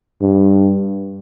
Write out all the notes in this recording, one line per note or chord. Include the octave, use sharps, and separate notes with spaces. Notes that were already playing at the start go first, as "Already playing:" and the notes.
G2